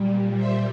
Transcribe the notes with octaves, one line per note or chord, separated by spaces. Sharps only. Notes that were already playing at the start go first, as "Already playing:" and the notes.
Already playing: A#2 G3
C5 E5